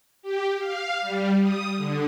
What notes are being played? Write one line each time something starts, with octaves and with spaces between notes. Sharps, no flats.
G4
F5
G3
D#6
D3